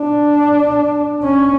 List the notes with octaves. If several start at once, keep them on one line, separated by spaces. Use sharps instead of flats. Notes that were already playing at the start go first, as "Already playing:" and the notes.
Already playing: D4
C#4